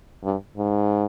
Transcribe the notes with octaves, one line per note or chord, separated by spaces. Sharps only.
G2
G#2